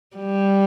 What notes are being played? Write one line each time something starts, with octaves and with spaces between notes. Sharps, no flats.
G3